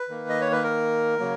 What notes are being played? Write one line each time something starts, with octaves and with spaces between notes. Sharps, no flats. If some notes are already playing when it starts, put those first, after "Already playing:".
Already playing: B4
D#3 A#3
D#5
C#5
B4
A#4
C#3 F#3 A#3